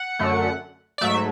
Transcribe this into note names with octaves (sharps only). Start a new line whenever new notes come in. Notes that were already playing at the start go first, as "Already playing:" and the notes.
Already playing: F#5
F#2 D3 A3
D5
G#2 F#3 A3 E5